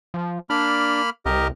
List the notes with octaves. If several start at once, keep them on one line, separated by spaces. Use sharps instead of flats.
F3
A#3 D4 B5 F6
C2 G4 A#4 D#5